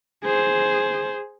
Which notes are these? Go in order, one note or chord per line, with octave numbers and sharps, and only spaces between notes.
G#4 C5